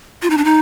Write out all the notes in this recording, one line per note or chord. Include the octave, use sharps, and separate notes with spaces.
F4
D#4
D4
D#4